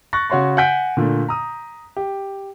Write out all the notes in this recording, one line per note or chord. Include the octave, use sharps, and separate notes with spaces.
C#6 F#6 A6 A#6
C#3 F#4 C#5 C6 C#6
F#5 G#5 G6 B6 D7
A#2 D3 A3
A#5 D#6
G4